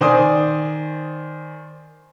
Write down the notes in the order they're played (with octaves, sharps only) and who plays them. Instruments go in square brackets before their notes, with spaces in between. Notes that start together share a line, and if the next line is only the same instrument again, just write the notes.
[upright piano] D#3 C5 D5 G#5 D#6